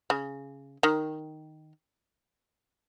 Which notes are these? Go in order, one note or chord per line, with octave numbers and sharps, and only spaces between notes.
C#3
D#3